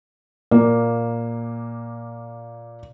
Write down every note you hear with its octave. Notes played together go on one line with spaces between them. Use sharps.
A#2 A#3